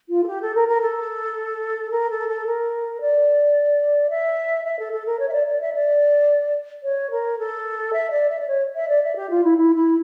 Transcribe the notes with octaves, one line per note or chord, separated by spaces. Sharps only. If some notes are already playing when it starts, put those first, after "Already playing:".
F4
A4
G4
A4
A#4
A#4
A4
A#4
A4
A4
A#4
D5
E5
E5
A4
A4
A#4
C#5
E5
D5
D5
E5
D5
C#5
A#4
A4
E5
D5
E5
D5
C#5
E5
D5
E5
G4
F4
E4
E4
E4